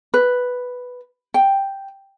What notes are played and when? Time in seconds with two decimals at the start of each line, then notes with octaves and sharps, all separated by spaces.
0.14 B4
1.34 G5